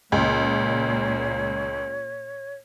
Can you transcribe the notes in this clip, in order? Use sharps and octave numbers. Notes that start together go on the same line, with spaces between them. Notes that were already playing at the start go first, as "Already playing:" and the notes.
C#2 A#2 C#5